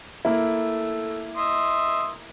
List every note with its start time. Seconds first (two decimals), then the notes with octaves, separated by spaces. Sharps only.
0.25 A3 A#3 E4
1.36 D#5 E5 C6